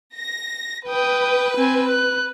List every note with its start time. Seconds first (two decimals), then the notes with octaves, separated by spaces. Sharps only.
0.16 A#6
0.89 B4 G5 D#6
1.57 C4 G#5
1.89 F#6